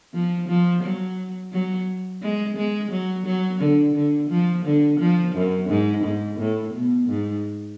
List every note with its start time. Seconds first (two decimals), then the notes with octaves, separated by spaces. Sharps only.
0.14 F3
0.48 F3
0.83 F#3
1.53 F#3
2.22 G#3
2.57 G#3
2.91 F#3
3.26 F#3
3.61 D3
3.96 D3
4.30 F3
4.65 D3
4.99 F3
5.35 F#2
5.69 G#2
6.04 G#2
6.39 A2
6.74 B2
7.08 G#2